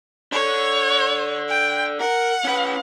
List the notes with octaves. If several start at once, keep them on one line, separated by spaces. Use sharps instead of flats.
D4 A4 C#5
G5
A#4 F#5
C#4 B4